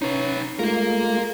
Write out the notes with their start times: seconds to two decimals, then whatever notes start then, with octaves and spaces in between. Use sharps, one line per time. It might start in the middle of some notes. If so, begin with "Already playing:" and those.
0.02 C#4 D#4 B4
0.59 G#3 A3 F4 A#4 F5